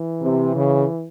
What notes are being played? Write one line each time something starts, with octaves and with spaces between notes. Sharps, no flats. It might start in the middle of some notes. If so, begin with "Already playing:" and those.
Already playing: E3
C3
C#3